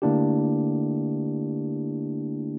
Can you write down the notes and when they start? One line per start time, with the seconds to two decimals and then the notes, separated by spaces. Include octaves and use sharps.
0.02 D3 A3 A#3 D4 E4 G4